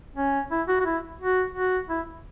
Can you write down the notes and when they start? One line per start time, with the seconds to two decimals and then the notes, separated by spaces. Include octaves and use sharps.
0.16 C#4
0.50 E4
0.68 F#4
0.80 F#4
0.86 E4
1.20 F#4
1.55 F#4
1.89 E4